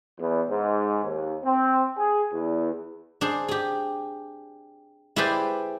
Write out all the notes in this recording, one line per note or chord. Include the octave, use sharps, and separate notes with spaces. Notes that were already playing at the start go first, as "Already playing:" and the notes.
E2
G#2
D#2
C4
G#4
E2
D4 G#4 C5
G4 G#4
E4 G4 G#4 B4 C5 D5